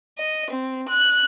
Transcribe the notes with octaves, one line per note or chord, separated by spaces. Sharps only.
D#5
C4
F#6